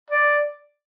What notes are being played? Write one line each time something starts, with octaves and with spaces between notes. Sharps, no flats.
D5